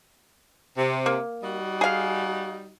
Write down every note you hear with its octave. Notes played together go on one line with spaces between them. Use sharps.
C3
A#3
G3 D#4 F#4
G#4 F5